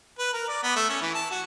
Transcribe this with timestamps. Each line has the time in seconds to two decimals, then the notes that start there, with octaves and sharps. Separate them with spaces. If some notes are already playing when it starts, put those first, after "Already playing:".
0.19 B4
0.33 A#4
0.48 D5
0.63 B3
0.76 A3
0.89 C#4
1.02 E3
1.14 A5
1.31 F#4